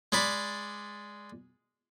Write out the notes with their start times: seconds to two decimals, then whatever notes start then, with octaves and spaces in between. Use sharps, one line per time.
0.12 G#3 D5 B5